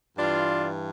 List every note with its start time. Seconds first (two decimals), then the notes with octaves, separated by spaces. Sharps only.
0.17 G2 E3 D4 F4